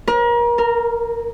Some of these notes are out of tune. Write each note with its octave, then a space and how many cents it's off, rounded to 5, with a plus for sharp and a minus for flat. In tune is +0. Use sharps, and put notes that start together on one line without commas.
A#4 +35
A#4 -10